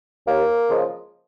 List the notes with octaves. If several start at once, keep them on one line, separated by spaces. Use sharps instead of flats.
D#2 A#3
C#3 F3 G#3